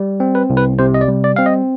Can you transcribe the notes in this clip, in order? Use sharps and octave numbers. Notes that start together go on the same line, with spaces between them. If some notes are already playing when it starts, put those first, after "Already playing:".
Already playing: G3
C4
B4
C2
B4
C3 C5
D#5
D5
G3
D5
C4 F5
D#5